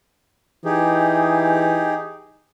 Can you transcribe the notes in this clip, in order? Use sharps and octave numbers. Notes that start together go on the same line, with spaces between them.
E3 D#4 G4 G#4